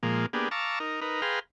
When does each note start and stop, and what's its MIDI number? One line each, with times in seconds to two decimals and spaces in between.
0.03 0.26 46
0.03 0.26 53
0.03 0.26 56
0.03 0.26 58
0.33 0.49 58
0.33 0.49 59
0.33 0.49 62
0.33 0.49 67
0.33 0.49 68
0.51 0.79 77
0.51 0.79 81
0.51 0.79 82
0.51 0.79 85
0.51 0.79 86
0.51 0.79 88
0.80 1.01 63
0.80 1.01 70
1.01 1.21 63
1.01 1.21 70
1.01 1.21 71
1.22 1.39 68
1.22 1.39 71
1.22 1.39 77
1.22 1.39 79
1.22 1.39 82
1.22 1.39 84